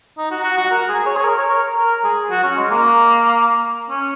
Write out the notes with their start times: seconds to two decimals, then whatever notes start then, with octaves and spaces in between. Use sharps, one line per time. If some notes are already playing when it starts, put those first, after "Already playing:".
0.18 D#4
0.31 F#4
0.44 F#4
0.58 F#4
0.71 A#4
0.89 G#4
1.06 C#5
1.16 G#4
1.24 A#4
1.38 C#5
1.51 A#4
1.77 A#4
2.04 G#4
2.31 F#4
2.44 C#4
2.57 G#3
2.71 A#3
3.90 C#4